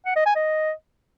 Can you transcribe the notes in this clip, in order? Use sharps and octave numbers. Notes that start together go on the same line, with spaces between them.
F#5
D#5
G#5
D#5